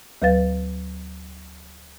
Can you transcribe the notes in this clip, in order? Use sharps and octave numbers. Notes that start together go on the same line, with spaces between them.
D2 F#3 B4 F5 A6